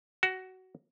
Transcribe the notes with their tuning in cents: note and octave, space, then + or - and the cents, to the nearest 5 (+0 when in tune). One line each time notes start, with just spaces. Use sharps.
F#4 +15